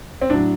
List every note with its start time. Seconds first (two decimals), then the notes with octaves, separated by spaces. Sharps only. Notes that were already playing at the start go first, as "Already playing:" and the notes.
0.21 C4
0.30 A2 F#3 D4